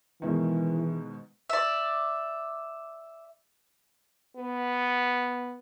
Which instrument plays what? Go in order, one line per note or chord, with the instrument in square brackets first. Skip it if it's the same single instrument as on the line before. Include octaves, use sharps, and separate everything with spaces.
[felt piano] G#2 B2 D#3 [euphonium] E3
[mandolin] D5 E5
[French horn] B3